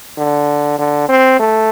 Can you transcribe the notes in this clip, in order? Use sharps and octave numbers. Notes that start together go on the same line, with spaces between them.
D3
D3
C4
A3